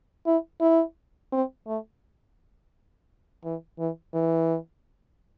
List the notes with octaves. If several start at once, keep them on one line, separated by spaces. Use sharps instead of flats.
E4
E4
C4
A3
E3
E3
E3